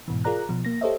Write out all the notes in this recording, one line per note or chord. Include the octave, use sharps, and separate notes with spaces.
G#2 B2 E3
F4 G#4 A#4 D5 A#5 F#6
B2 F3
A#3 A#6
G4 A4 C5 C#5 D#5 E5